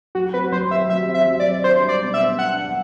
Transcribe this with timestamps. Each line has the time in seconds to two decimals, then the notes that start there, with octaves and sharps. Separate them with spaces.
0.15 F#3 F#4
0.33 C4 B4
0.52 F#3 C5
0.71 G4 E5
0.90 F#3 E5
1.08 C4
1.14 E5
1.27 F#3
1.40 D5
1.46 G4
1.64 D4 C5
1.83 G3
1.89 D5
2.02 B2
2.14 E5
2.21 B3
2.39 D4 F#5
2.58 G3